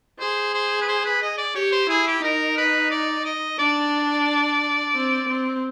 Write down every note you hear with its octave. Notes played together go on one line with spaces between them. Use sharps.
G#4 C5
C5
B4
C5
B4
D#5
D5
G4 C#5
C5
E4 G#4
G4
D#4 A#4
B4
D5
D#5
D4 D5
C4
C4